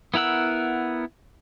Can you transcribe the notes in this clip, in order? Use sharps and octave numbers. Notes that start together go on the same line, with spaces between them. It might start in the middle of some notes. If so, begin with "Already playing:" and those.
B3 E4 A#4 F#5 E6